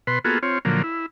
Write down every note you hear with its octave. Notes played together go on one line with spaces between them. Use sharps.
B2 B4 C6
A#3 B3 F4 F#4 G#4 A4
C4 F4 C#5
A#2 D3 F3 F#3 A#3
E4